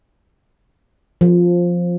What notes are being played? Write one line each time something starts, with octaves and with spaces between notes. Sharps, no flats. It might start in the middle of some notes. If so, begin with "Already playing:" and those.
F3